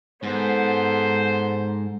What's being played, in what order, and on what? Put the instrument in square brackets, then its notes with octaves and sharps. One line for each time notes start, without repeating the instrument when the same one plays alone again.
[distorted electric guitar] G#2 [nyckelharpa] B3 A4 [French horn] C5